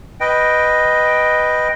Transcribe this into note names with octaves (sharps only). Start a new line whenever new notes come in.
B4 D#5 G5